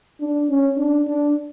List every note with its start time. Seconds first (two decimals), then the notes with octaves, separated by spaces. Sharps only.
0.21 D4
0.50 C#4
0.78 D4
1.07 D4